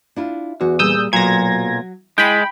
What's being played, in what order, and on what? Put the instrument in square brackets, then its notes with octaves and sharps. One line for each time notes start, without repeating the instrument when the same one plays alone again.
[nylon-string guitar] D4 E4 F4
[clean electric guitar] E2 [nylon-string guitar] F#4
[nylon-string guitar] A#2 G3 G#4 [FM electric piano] D#6 E6 G6
[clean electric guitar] B1 A#2 [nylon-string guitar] F#3 [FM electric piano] G#6 A#6
[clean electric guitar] G#3 [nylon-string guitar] E4 [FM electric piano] G5 B5